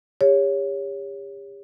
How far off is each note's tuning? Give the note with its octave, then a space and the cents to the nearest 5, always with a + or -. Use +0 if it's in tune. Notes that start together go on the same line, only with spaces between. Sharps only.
G4 +40 C#5 +10